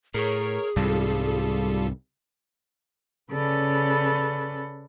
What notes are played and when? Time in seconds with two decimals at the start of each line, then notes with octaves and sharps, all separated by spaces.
0.14 A2 G#4 A#4 C#5
0.76 C2 G#2 G3 F4 A4
3.31 C#3 C#4 A4 B4 D5 B5